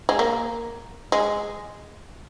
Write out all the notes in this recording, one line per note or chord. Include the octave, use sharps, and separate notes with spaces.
G#3
A#3
G#3